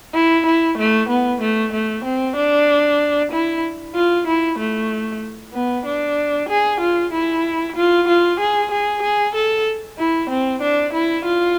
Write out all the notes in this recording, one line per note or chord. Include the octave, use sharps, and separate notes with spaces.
E4
E4
A3
B3
A3
A3
C4
D4
E4
F4
E4
A3
B3
D4
G#4
F4
E4
F4
F4
G#4
G#4
G#4
A4
E4
C4
D4
E4
F4